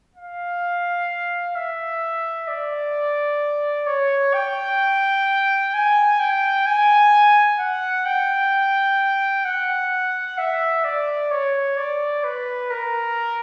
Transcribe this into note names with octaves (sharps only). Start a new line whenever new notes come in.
F5
E5
D5
C#5
G5
G#5
G5
G#5
F#5
G5
F#5
E5
D5
C#5
D5
B4
A#4